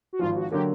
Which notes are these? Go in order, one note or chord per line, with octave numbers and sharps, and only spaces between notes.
F#4
G#1 G#2 F3 F4
F#4
D3 F#3 A#3 G4